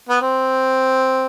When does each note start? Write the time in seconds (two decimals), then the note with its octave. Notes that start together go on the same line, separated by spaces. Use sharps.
0.09 B3
0.21 C4